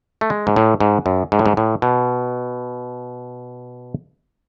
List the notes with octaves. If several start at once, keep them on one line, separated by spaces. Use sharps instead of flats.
A3
G#3
G#2
A2
G#2
F#2
G#2
A2
G#2
A2
B2